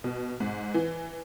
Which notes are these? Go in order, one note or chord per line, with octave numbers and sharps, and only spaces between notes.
B2
G#2
E3